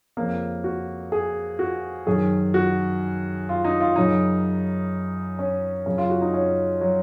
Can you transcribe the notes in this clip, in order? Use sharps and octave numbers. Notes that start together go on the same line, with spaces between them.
F2 C#3 A#3
F#4
G#4
F#4
F#2 D#3 G#4
F#4
F4
D#4
F4
F#2 C#3 D#4
C#4
F#2 C#3 C#4
F4
F#4
D#4
C#4
F#3